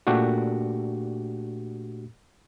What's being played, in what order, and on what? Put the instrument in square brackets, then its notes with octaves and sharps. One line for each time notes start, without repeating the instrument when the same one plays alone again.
[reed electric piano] A#2 A3 D4 F#4 G4